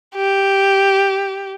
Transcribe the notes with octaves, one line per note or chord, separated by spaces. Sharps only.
G4